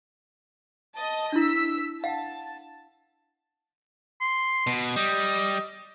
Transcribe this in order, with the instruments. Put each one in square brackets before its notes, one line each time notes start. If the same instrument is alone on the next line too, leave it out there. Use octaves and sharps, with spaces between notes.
[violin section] D#5 A5 D#6
[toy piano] D4 E4 [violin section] E6 B6
[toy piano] F5 F#5 [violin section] A5
[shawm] C6
[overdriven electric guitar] B2
[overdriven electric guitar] G3 [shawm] D#5